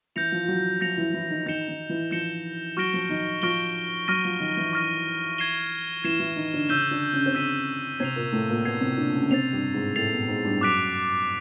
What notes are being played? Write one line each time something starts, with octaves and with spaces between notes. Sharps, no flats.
E3 E4 G6 A#6 C#7 F7
F3 F4
F4
F#3 F#4
F3 F4 G6 A#6 C#7 F7
E3 E4
E3 E4
D#3 D#4
D#3 D#4 G6 A#6 C#7 E7 G7
D#3 D#4
E3 E4
F3 F4 G6 A#6 C#7 E7 G7
F#3 F#4 C#6 F6 A#6 D7 G7
F3 F4
D#3 D#4
F3 F4 C#6 F6 A#6 D7 G7
F#3 F#4 C#6 F6 A#6 D#7
F3 F4
D#3 D#4
E3 E4
C#6 F6 A#6 D#7
G#6 C7 E7 G7
E3 E4 G#6 C7 E7 G7
E3 E4
D#3 D#4
D3 D4
C#3 C#4 E6 G6 B6 D#7 G7
D3 D4
C#3 C#4
C4
C#3 C#4 E6 G6 B6 D#7 G7
C3 C4 G#6 C7 F7
A#2 A#3
A2 A3
A#2 A#3
B2 B3 G#6 C7 F7
C3 C4
D3 D4
C#3 C#4
C3 C4 A6 C7 F7
G2 G3
G#2 G#3
A2 A3 A6 C7 F7
B2 B3
G#2 G#3
G2 G3
F#2 F#3 D6 F#6 B6 D7 F7